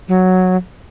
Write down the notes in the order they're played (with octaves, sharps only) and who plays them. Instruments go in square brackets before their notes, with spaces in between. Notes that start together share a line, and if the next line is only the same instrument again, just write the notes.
[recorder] F#3